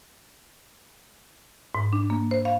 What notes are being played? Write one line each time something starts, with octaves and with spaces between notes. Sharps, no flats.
G#2
D4
A#3
C5
F5